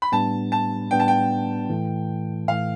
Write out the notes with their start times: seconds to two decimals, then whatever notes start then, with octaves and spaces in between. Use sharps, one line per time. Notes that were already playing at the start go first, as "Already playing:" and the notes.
0.02 B5
0.12 A2 G3 B3 D4 A5
0.52 A5
0.91 A2 G3 B3 D4 G5
1.00 A5
1.08 G5
1.69 A2 E3 A3
2.48 A2 E3 A3 F5